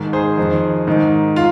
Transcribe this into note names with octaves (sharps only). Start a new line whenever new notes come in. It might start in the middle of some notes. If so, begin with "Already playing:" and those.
Already playing: G#2 D#3
G#4 C5
F2 D#3
G#2 D#3
F4